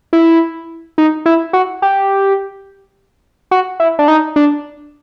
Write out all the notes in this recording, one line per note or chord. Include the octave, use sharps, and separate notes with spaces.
E4
D#4
E4
F#4
G4
F#4
E4
D4
D#4
D4